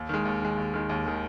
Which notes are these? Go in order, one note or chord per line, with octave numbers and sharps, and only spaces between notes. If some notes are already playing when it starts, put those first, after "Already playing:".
Already playing: D#2
D#3 G#3
D#2
D#3 G#3
D#2
D#3 G#3
D#2
D#3 G#3